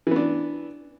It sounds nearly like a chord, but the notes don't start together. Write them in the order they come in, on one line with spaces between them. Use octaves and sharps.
E3 B3 D4